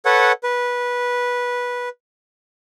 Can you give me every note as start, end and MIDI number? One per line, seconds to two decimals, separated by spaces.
0.05 0.32 69
0.05 0.32 71
0.05 0.32 73
0.05 0.32 78
0.43 1.89 71